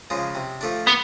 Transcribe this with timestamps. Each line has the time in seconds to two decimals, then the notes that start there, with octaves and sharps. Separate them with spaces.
0.10 C#3 F3 G#3
0.35 C3
0.61 F3 A3 D4
0.87 B3